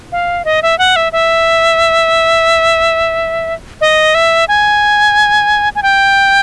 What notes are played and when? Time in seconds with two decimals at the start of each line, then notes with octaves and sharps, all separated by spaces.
0.12 F5
0.45 D#5
0.63 E5
0.79 F#5
0.96 E5
1.12 E5
3.81 D#5
4.15 E5
4.48 G#5
5.75 G#5
5.83 G5